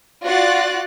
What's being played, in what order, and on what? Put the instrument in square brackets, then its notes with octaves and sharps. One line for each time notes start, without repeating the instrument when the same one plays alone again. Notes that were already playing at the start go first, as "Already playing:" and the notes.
[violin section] F4 F#4 D5 F#6 A6